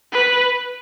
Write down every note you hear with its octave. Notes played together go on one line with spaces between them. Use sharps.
B4